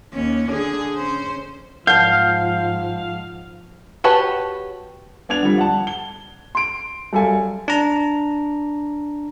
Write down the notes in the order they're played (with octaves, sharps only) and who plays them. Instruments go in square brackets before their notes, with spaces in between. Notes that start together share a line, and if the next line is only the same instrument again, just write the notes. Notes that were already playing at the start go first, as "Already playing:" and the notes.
[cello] D#2 C#4
D3 G#4
C#4 C5
[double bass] G#2 F3 [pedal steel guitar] F5 [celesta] F#5 A5 [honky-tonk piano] G6
[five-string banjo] F#4 G4 B4 C#5 A5
[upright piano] B3 D4 G#6 F7
D3 F3 G3
F#5 A5
G7
C6 D7
F#2 G3 A4 F5 G#5
[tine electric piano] D4 A#5